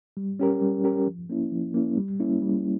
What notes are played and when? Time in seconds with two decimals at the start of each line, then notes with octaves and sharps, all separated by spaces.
0.17 G3
0.40 C#4 G4 A#4
0.61 G3
0.84 C#4 G4 A#4
1.07 F3
1.30 A#3 C#4 E4
1.52 F3
1.74 A#3 C#4 E4
1.97 G3
2.20 A#3 C#4 E4
2.42 G3